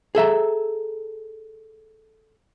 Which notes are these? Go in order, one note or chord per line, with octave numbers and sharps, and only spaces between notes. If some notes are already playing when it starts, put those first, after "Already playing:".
G#4 A4 E5 A#5